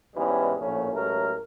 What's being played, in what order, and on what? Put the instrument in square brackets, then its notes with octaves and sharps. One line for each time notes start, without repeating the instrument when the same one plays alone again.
[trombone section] E2 G#2 E3 G3 G#3 C#4
A#1 A2 A#3 C#4
A1 F#3 G#3 A3 A#4